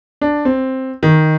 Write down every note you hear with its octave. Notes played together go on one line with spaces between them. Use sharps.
D4
C4
D#3